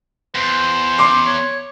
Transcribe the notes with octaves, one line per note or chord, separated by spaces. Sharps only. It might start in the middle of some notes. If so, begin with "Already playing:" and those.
E2 C5
C6 D6 C7
C#5